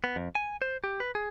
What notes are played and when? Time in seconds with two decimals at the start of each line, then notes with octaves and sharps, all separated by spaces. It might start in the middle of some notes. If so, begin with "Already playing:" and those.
0.04 B3
0.16 F2
0.35 G#5
0.62 C5
0.84 G4
1.00 B4
1.15 G#4